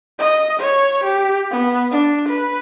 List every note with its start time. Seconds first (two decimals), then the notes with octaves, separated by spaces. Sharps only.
0.19 D#5
0.60 C#5
1.04 G4
1.51 B3
1.91 D4
2.28 B4